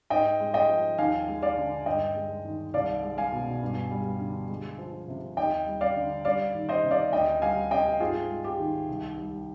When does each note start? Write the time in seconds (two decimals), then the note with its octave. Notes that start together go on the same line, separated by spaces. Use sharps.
0.10 G#2 D#5 G5
0.40 G#3
0.54 D#5 G5
0.69 F3
0.98 D#2 F5 G#5
1.28 G#3
1.43 D5 F5
1.57 D3
1.86 G2 D#5 G5
2.15 G#3
2.45 D#3
2.74 C2 D5 F5
3.03 G#3
3.18 F5 G#5
3.32 B2
3.62 G2
3.91 G3
4.20 D3
4.49 G#3
4.78 F3
5.08 C3
5.37 D#2 D#5 G5
5.66 G3
5.81 D5 F5
5.96 D3
6.25 G3 D5 F5
6.54 D#3
6.69 C5 D#5
6.83 C3
6.91 D5 F5
7.13 D2 D#5 G5
7.42 G3 F5 G#5
7.71 C3 D#5 G5
8.00 G#2 F4 G#4
8.30 G#3
8.44 G4
8.59 D#3
8.89 C2
9.18 G3